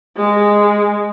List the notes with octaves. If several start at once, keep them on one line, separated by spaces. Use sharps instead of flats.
G#3